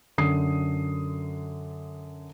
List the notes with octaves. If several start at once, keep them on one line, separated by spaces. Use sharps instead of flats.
F#2 D3 D#6 C7